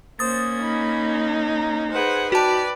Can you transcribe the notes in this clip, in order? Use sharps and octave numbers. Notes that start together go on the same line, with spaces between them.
A#3 C#4 C5 D#6 A6
D#4 B5
A#5
G#4 B4 C5 F#5
F#4 B4 D5 G5 A5